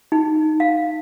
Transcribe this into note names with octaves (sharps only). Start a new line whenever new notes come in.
D#4
F5